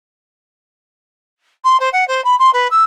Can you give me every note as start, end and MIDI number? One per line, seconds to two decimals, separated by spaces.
1.64 1.79 84
1.80 1.89 72
1.92 2.06 78
2.07 2.23 72
2.24 2.35 83
2.39 2.50 84
2.53 2.67 71
2.70 2.83 88